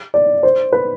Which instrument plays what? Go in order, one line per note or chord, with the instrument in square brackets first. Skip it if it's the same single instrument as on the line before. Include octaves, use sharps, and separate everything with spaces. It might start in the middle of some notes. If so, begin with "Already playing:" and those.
[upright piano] D5
C5
B4